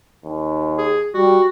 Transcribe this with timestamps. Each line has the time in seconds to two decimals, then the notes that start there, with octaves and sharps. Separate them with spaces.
0.24 D#2
0.78 G#4
1.14 G3 F#4